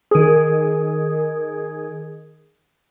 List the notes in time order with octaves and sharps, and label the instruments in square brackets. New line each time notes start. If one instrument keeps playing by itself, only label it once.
[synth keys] D#3 G#4